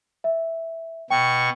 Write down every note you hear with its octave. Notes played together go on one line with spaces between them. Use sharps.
E5
B2 G5 C#6